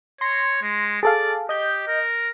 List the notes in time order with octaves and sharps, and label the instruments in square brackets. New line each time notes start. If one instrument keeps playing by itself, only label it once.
[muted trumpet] C#5 [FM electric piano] C6 A#6
[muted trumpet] G#3
[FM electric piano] G#4 A4 F5 [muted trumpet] D5
[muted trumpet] G4 [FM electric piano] D#5 G6
[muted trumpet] A#4